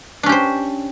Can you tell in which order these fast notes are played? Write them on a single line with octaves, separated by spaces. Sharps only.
D4 C#4 G4 C5